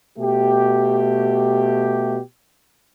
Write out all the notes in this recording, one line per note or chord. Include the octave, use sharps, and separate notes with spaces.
B2 A3 G4